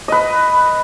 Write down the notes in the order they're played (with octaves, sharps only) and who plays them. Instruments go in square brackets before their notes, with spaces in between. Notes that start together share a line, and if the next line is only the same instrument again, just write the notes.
[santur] B4 D#5